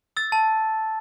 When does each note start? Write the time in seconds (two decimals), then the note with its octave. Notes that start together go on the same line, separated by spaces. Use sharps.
0.17 E6 A6
0.32 A5